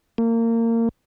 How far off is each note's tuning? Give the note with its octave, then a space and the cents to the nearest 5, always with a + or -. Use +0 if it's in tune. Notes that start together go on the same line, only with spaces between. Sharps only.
A#3 -25